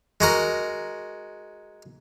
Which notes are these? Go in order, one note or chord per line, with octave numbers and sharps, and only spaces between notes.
G#3 F#4 A#4